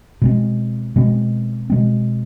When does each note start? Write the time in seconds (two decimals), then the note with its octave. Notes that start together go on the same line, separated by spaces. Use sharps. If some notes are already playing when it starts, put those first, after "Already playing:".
0.22 B2 G#3 C4
0.96 B2 G#3 C4
1.70 B2 G#3 C4